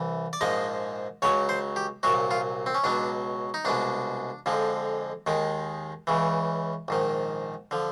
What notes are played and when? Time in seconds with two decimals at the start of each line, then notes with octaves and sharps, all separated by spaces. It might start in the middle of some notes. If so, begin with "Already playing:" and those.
Already playing: C2 E3
0.33 D5
0.41 A#1 G#2 F3 G#3 D#5
1.22 C#2 C#3 F#3 C#5
1.49 C5
1.76 G4
2.03 C2 A#2 F#3 F#4
2.31 F4
2.66 C4
2.75 C#4
2.84 C#2 B2 F#3 D4
3.54 D#4
3.65 C2 B2 G#3 D4
4.46 F2 D3 F3 G#3
5.26 D#2 D#3 G#3
6.07 C#2 C#3 E3
6.88 A#1 G#2 D#3
7.71 D3 F3